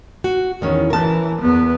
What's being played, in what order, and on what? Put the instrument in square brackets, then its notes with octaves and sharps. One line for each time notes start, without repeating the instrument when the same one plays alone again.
[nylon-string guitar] F#4
[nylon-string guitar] E2 C#4 [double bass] D#3
[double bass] E3 [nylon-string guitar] A#4 A5
[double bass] E2 B3